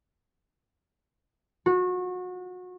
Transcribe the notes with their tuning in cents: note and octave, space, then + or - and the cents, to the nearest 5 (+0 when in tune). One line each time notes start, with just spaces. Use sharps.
F#4 -30